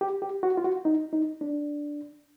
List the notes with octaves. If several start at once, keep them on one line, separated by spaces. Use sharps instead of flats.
G4
G4
F#4
F4
F#4
D#4
D#4
D4